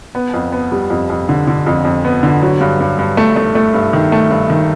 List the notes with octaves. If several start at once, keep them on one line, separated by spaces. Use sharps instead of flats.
B3
F2
B3
G3
F2
F2
D3
D3
F2
F2
B3
D3
F#3
G2
G2
G2
A3
A3
A3
G2
D#3
A3
G2
D#3